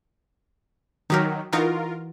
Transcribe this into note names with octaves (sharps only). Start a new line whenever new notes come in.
D#3 F#3 D#4 G4 A#4
E3 D#4 F4 F#4 A#4